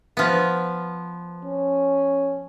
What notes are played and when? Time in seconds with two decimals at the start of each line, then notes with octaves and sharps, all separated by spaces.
0.17 F3 B3
1.44 C#4